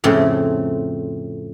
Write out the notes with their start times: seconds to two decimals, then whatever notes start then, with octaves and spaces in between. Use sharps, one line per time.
0.04 F2 A2 C#3 C4